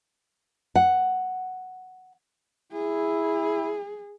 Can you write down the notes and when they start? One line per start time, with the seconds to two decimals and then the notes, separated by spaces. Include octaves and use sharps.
0.76 F#5
2.72 E4 G#4